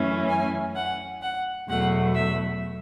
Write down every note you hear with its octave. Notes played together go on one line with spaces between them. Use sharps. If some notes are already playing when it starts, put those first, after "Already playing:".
Already playing: F#2 E3 A3 C#4
G#5
F#5
F#5
E2 B2 F#3 A3 F#5
E5